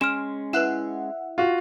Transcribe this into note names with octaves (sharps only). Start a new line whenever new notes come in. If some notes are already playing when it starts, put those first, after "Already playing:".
G#3 C#4 C6 F6 D7 E7
E4 B4 E5 F#5 F#6 E7
F4 F#4